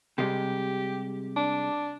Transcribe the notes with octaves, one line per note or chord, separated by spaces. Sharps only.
C3 G3 G#3 G4
D4